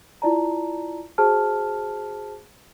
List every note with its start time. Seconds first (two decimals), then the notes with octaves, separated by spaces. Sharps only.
0.22 E4 F4 D5 A5 A#5
1.18 F#4 G#4 C5 A5 F6